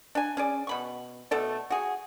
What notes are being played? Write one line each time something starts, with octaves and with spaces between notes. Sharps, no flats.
D4 G#5
C#4 G#4 D5
B2 B5 C#6
B2 A3 A4 D5
F#4 G#4